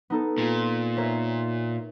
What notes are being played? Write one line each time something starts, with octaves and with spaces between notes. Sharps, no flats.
B3 D#4 A4
A#2
A#4 C#5 E5